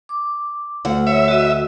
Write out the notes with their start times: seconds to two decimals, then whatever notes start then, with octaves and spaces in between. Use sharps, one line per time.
0.09 D6
0.85 D2 F#5
1.07 C#5 E5
1.28 F#4 D#5